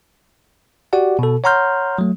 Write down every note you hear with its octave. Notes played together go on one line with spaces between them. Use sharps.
F#4 G4 D5 F#5
B2 A4
C#5 F#5 A#5 C6 F6 G6
F#3 A3